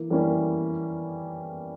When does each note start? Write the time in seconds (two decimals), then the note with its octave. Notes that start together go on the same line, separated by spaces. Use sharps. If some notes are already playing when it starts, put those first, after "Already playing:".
Already playing: E3 A#3
0.10 E3 G3 A#3 C#4